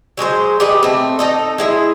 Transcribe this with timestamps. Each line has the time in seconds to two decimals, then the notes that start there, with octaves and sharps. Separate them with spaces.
0.17 F#3 G#3 G#4 C5
0.60 G4 G#4 B4 D#5
0.83 A3 C4
1.19 D#4 A4 D#5
1.58 G#3 E4 G#4